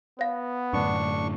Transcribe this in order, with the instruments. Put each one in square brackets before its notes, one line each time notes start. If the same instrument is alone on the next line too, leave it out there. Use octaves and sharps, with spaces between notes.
[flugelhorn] B3 [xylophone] C#5 F5
[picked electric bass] F#2 A2 D3 [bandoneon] D4 C#6